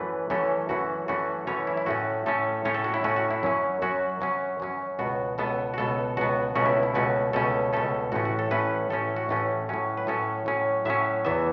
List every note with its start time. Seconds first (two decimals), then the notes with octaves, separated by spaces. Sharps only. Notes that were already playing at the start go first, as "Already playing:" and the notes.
Already playing: F#2 E3 A3 B4
0.30 F#2 E3 A3 C#4 A4
0.69 F#2 E3 A3 C#4 F#4
1.08 F#2 E3 A3 C#4 F#4
1.47 F#2 E3 A3 C#4 C#5
1.67 E4
1.77 E4
1.86 A2 A3 C#4 F#4
2.26 A2 A3 C#4 A4
2.65 A2 A3 C#4 C#5
2.74 A4
2.84 F#4
2.94 E4
3.04 A2 A3 C#4 F#4
3.16 F#4
3.31 E4
3.43 F#2 F#3 C#4
3.82 F#2 F#3 C#4 F#4
4.21 F#2 F#3 C#4
4.60 F#2 F#3 C#4
4.99 C#2 B2 B3 F#4
5.38 C#2 B2 B3 A4
5.74 F#4
5.78 C#2 B2 B3 A4
6.17 C#2 B2 B3 F#4
6.55 C#2 B2 A3 C#4 F#4
6.66 E4
6.83 E4
6.94 C#2 B2 A3 C#4 F#4
7.33 C#2 B2 A3 C#4 A4
7.73 C#2 B2 A3 C#4 A4
8.12 A1 A2 A3 C#4 F#4
8.25 F#4
8.39 A4
8.51 A1 A2 A3 C#4 B4
8.90 A1 A2 A3 C#4 A4
9.16 F#4
9.29 A1 A2 A3 C#4
9.69 A2 F#3 C#4
9.97 B4
10.07 A2 F#3 C#4 A4
10.46 A2 F#3 C#4
10.85 A2 F#3 C#4 E5
11.25 E2 E3 B3 E5